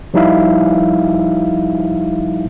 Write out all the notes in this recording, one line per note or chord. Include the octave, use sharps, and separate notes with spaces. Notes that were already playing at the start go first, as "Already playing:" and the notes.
F3 G3 D#4 E4 E5 F5